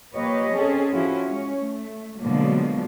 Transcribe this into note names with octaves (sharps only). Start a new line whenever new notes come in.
F3 A#3 G4 B4 C#5 D#5
C4 C#4 G#4 A4
F3 C#4 E4 F#4
G#3 C#4 C#5
A3
B2 D3 F3 F#3 G#3 A#3